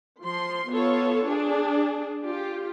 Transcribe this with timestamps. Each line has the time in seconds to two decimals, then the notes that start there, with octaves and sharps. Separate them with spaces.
0.23 F3 C6
0.70 B3 F4 A4 C#5
1.28 D4 G#4
2.24 F4 G4